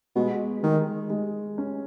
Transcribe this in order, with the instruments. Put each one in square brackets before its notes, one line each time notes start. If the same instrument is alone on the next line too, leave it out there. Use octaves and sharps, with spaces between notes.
[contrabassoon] B2 [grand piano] G#3
[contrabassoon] D#3 [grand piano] G#3
[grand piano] G#3
C#4